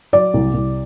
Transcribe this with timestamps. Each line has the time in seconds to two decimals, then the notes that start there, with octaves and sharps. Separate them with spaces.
0.13 F#3 D5
0.34 C2
0.54 C2